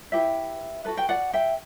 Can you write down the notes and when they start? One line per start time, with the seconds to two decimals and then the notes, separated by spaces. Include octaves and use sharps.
0.12 E4 G4 B4 E5 G5
0.85 F#4 A4 B4
0.97 G5
1.09 D5 F#5
1.33 E5 G5